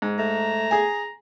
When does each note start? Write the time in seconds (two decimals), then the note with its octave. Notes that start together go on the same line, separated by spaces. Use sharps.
0.02 G#2
0.19 A3 A#5
0.71 G#4 G#5